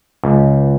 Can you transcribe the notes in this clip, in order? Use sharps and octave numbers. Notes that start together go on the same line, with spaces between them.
C#2